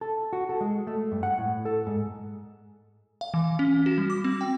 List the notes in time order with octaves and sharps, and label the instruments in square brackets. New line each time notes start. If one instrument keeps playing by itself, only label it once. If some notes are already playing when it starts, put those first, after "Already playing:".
[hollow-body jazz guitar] A4
F#4
A4
G#3
A3
G2
F#5
A2
A4
G#2
[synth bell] F5
E3
C#4
F#4
G3
D6
C4
G5